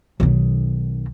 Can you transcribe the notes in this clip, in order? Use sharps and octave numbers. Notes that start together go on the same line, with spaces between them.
B1 D#3